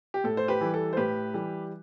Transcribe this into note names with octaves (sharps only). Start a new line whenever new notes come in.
G4
A2 A4
C5
G4 B4
E3 G3
A4
C5
A2 G4 B4
E3 G3